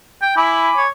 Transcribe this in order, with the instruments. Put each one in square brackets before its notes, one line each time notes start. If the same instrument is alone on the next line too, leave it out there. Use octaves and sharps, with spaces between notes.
[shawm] G5
[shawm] E4 [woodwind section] G#5 B5 D6
[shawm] C#5